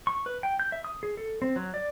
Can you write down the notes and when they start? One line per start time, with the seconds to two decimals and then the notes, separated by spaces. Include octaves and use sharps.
0.07 C#6
0.26 B4
0.43 G5
0.60 G6
0.72 E5
0.84 D#6
1.03 G#4
1.17 A4
1.42 C4
1.56 F#3
1.74 D5